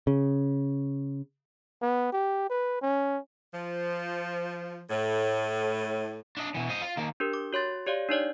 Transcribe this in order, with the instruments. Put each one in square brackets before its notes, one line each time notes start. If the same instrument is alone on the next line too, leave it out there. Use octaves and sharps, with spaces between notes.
[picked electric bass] C#3
[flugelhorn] B3
G4
B4
C#4
[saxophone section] F3
A2
[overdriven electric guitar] D4 D#5
B2 E3
C5 D#5
F4
D#3 A#3
[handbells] D4 G4 A#4
D6
F#4 C#5 C6 A6
G4 C#5 D5 F5
D4 D#4 C#5 D5